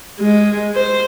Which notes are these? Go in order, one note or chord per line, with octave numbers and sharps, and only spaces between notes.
G#3
C5